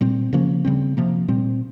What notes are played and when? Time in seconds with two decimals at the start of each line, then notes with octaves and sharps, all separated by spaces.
0.01 A#2 G3 C4
0.33 C#3 F3 A#3 C#4
0.65 C#3 G3 C4
0.97 C3 F3 A#3
1.28 A#2 G3 C4